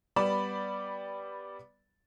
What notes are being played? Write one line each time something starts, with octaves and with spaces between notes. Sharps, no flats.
G3 B3 D5 B5 E7